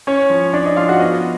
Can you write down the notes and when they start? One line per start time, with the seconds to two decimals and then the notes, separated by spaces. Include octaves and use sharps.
0.07 C#4 C#5
0.30 F3
0.53 C#4 D4 D5
0.65 D#4 D#5
0.76 F3 F4 F5
0.88 F#4 F#5
1.00 B3 D#4 D#5